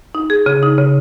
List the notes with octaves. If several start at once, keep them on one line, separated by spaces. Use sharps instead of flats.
D#4
G#4
C#3
D#4
C#3